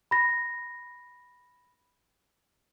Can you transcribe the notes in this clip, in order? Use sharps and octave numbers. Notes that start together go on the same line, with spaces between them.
B5 A#6